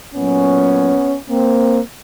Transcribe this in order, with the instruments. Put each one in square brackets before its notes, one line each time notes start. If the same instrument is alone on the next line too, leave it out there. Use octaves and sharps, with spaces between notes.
[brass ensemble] A#2 F#3 B3 C#4
A#3 C4